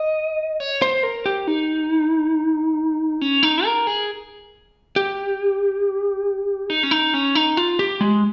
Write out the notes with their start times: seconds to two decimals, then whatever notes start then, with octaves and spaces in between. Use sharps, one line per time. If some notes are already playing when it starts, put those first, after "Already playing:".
Already playing: D#5
0.60 C#5
0.82 C5
1.03 A#4
1.26 G4
1.47 D#4
3.21 C#4
3.43 D#4
3.65 A#4
3.87 G#4
4.96 G4
6.70 D#4
6.83 C#4
6.91 D#4
7.14 C#4
7.35 D#4
7.57 F4
7.79 G4
8.01 G#3